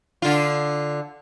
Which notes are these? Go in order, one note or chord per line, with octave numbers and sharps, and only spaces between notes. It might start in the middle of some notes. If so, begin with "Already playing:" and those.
D3 F4